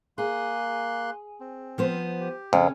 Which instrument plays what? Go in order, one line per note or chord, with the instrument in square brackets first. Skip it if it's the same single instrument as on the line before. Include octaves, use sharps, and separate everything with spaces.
[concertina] A#3 C6 F#6 [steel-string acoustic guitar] G#4
[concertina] C4
[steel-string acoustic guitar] F3 B3 C5
[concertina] G4
[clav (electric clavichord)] F2 [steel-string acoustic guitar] C#3 C#4